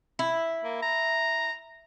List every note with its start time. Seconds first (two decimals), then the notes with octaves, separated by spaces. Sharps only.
0.19 E4
0.64 A#3
0.82 A#5